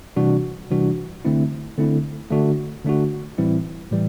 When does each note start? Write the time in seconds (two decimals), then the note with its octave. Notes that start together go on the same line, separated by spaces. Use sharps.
0.16 C3 E3 G3 D4 F#4
0.71 C3 E3 G3 D4 F#4
1.25 D3 A3 C4 E4
1.78 D3 A3 C4 E4
2.31 D3 A3 D4 F#4
2.85 D3 A3 D4 F#4
3.38 A2 E3 G3 C4 E4
3.92 A2 E3 G3